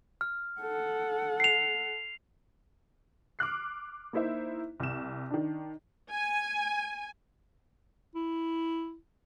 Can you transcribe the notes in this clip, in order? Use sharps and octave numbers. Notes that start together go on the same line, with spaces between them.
F6
A4 F#5
C7 F7
D6 F6 F#6 C7
A#3 D#4 E4 C5 E5
C2 E7
D#3 D4
G#5
E4